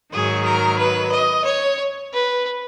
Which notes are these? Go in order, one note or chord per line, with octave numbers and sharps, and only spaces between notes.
G#2 D#3 F#3 G#4
A#4
B4
D#5
C#5
B4